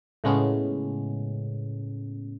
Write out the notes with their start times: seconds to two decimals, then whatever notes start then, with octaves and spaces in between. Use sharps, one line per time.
0.24 A2 C#3 G#3 A3 B3 C#4